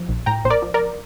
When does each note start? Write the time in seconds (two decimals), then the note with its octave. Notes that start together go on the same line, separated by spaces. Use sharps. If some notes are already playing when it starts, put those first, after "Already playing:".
Already playing: F3
0.09 A#1
0.26 A2 G5 A#5
0.45 A#1 C5
0.50 A#4 D5
0.62 F3
0.74 A#4 D5